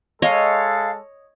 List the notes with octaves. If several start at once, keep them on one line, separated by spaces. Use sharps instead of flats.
G#3 A4 C#5 D#5 F5